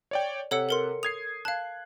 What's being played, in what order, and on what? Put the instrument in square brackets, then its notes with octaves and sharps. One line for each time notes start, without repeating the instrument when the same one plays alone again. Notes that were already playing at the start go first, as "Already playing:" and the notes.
[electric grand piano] C#5 D5 G5
[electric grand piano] C3 F#5 C#7 [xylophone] A4 C#5 E6
[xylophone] A4 A#4 C6
[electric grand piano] D#6 G#6 C7 [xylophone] F7
[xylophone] F5 A5 [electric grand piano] F#6